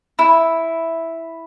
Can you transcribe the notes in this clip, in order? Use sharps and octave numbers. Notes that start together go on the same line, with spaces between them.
E4